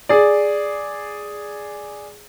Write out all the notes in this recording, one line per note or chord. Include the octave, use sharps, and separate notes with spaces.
G#4 D5